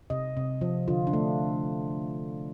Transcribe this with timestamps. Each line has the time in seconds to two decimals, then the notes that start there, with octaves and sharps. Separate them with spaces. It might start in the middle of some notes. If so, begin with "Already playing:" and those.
0.10 C3 D#5
0.37 C3
0.61 F3
0.88 D3 F4
1.07 D4
1.13 A3